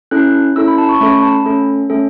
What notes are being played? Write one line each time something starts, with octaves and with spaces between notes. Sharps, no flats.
C#4 E4 A4 F#6
C#4 E4 A4 E6
B5
A5
C#6
A3 C#4 A4 B5
B5
A5
B5
A3 C#4 A4
A3 C#4 A4